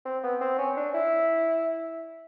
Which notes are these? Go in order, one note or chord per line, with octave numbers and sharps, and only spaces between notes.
C4
B3
C4
C#4
D4
E4